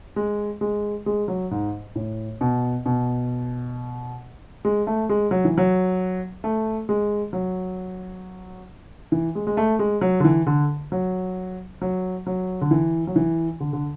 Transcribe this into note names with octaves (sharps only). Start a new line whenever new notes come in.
G#3
G#3
G#3
F#3
G#2
A2
B2
B2
G#3
A3
G#3
F#3
E3
F#3
A3
G#3
F#3
E3
G#3
G#3
A3
G#3
F#3
D3
E3
D3
F#3
F#3
F#3
D3
E3
F#3
E3
D3
D3